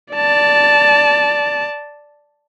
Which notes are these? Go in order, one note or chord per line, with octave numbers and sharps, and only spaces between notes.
D5 A5